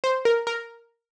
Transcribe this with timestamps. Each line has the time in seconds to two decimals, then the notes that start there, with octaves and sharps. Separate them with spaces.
0.04 C5
0.25 A#4
0.47 A#4